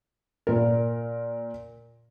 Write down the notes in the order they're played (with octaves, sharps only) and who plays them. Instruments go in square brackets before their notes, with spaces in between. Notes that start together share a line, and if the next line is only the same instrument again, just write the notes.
[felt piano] A#2 A#4